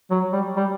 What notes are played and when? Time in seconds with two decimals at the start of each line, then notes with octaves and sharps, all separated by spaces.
0.11 F#3
0.33 G3
0.56 G3